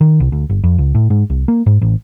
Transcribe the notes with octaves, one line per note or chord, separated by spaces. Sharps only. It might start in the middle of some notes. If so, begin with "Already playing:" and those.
D#3
C2
D2
G1
F2
C#2
A2
G#2
C2
A#3
G#2
A1